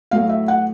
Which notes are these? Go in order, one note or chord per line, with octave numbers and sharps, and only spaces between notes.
A2 F#3 A3 F5
E5
F#5